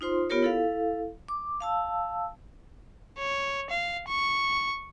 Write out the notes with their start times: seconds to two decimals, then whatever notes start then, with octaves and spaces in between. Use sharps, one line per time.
0.01 D#4 F4 C5 C6
0.30 B3 F4 G4 A#4 C#5
0.43 E4 A4 F5
1.28 D6
1.60 F5 A5 E6
3.18 C#5
3.70 F5
4.08 C#6